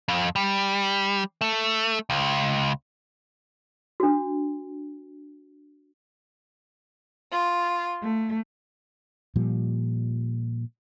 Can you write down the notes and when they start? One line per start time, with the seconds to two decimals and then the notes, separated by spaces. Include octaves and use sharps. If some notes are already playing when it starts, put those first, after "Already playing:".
0.08 F2
0.36 G3
1.41 A3
2.10 C#2
4.00 D4 F#4
7.32 F4
8.03 A3
9.36 A#2 F3 G3